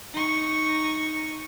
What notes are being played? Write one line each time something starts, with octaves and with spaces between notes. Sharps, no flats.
D#4 C#6